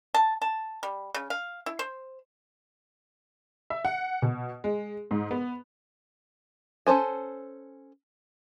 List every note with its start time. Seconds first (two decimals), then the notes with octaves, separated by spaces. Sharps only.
0.14 A5
0.42 A5
0.83 G3
1.14 C#3
1.30 F5
1.66 E4
1.79 C5
3.70 E5
3.85 F#5
4.22 B2
4.64 G#3
5.11 G#2
5.31 B3
6.87 C#4 A4 C5 G#5